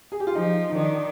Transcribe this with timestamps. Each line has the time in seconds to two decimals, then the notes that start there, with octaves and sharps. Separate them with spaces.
0.12 G#4
0.20 G4
0.27 F4
0.35 F3 D#4
0.70 D#4
0.75 D#3 D4